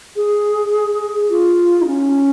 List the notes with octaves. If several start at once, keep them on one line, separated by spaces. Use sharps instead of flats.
G#4
F4
D#4
C#4